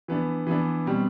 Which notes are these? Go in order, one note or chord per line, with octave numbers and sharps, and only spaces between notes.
E3 B3 D4
E3 B3 D4
B2 G3 C4